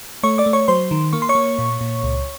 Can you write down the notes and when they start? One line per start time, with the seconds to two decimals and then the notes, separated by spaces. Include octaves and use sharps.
0.23 A3 C#5 C#6
0.38 D5 D6
0.46 A3
0.53 C#5 C#6
0.68 F#3 C5 C6
0.91 D#3
1.13 A#3 C#6
1.22 C6
1.29 C#5 C#6
1.35 A#3
1.58 A#2
1.81 A#2
2.04 C#2